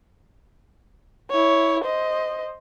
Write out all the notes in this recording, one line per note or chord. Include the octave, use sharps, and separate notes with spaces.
E4 C#5
C5 D#5